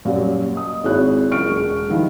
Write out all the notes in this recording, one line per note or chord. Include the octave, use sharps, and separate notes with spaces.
F#2 A#2 F#3 G3
D#5 D#6
G#1 E4 F#4 G#4 C#5 F#6
F#1 F4 C#6 F6 D7
E1
D#3 F3 G3 E4